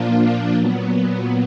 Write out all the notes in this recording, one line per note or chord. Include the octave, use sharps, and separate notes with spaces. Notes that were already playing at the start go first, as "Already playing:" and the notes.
Already playing: A#2 F3 A#3 D4 F4
A#2 F#3 B3